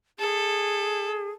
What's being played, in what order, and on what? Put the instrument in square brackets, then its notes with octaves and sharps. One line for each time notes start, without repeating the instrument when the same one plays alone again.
[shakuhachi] G#4 [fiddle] A4